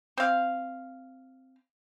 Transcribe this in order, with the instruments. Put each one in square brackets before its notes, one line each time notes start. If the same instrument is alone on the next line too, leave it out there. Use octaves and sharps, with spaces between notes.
[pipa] C4 F5